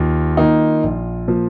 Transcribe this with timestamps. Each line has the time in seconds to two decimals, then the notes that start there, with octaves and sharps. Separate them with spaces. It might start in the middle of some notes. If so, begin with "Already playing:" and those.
Already playing: D#2 F4
0.37 D#3 A#3 D#4
0.83 A#1
1.28 A#2 F3